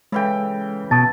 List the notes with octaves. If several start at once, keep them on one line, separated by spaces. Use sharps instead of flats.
C#3 E3 G#3 A4 G5
B2 A5 A6